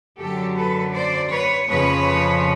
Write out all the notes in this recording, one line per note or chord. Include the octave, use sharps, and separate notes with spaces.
F#2 D3 F#3 G4 A4
A4 B4
C5 D5
B4 C#5
F2 C#3 F3 B4 C#5